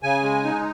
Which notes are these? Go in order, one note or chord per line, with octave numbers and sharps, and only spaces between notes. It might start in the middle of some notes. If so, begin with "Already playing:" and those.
C#3 G#5
G#3
D#4